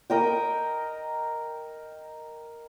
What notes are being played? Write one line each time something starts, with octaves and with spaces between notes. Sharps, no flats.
A#4 D#5 G5